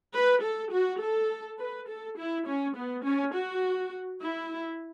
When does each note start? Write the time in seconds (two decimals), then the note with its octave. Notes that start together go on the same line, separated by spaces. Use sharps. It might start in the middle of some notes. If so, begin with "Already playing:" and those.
0.14 B4
0.43 A4
0.73 F#4
1.02 A4
1.59 B4
1.88 A4
2.17 E4
2.46 C#4
2.75 B3
3.04 C#4
3.33 F#4
4.21 E4